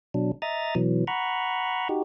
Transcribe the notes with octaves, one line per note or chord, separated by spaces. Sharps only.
B2 F#3 D4
D#5 E5 A#5 D#6 A6
B2 E3 F#3
F#5 A#5 B5 C#6
D#4 F#4 G4